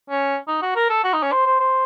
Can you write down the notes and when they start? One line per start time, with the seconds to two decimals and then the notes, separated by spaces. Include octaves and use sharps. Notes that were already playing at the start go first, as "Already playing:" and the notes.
0.10 C#4
0.48 D#4
0.62 F#4
0.76 A#4
0.89 A4
1.04 F#4
1.13 D#4
1.23 C#4
1.32 C5
1.46 C5
1.60 C5